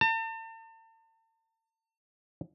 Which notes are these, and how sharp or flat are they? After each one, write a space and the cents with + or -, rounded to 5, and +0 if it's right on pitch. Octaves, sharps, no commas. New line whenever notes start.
A5 +40